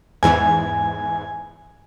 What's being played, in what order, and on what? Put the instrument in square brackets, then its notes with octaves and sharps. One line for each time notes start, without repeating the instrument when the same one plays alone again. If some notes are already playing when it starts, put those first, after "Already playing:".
[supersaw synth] E2 G#2 E3 [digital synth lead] G#5